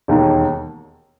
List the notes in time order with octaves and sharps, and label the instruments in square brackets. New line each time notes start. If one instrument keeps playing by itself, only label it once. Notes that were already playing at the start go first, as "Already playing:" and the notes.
[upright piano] E1 D#2 D#3